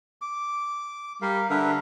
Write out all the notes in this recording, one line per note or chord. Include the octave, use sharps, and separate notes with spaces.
D6
G3 A#4 F5
D3 A#4 B4 E5